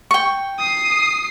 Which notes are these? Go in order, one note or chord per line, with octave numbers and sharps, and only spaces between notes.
G5 C#6
D#6 C7